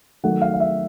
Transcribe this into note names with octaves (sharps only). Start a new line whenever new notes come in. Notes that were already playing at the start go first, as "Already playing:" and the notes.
D#3 F#3 A3 F#5
F5
F5
E5